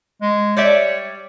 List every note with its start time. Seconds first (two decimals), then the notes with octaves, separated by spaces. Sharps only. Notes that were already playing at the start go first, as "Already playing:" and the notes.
0.22 G#3
0.57 G3 C#5 D5 E5